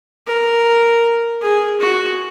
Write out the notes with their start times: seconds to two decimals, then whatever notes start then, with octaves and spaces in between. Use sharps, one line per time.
0.27 A#4
1.42 G#4
1.80 F#4